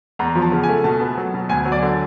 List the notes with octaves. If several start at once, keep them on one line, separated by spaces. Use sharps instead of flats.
E2 A#5
F3
A5
C#3
G#5
A3
B2 A5
B3
F#3
B2
D2 G#5
F#3
D5
D3